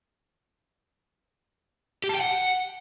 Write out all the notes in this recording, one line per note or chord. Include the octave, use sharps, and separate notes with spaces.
G4
A5
G5
F#5